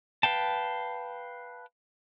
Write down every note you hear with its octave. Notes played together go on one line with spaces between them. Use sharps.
B4 F5 G5 A5